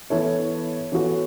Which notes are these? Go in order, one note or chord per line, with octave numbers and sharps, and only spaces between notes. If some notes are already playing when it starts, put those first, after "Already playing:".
E3 B3 E4 A4 C#5
E3 B3 F#4 A4 C#5